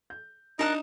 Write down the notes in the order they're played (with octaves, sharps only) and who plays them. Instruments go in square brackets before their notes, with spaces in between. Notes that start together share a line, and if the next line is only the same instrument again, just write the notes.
[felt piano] G6
[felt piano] D4 [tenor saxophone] D#4 [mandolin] A#4 A5 F#6